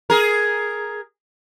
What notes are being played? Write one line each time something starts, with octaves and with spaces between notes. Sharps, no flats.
G#4 A#4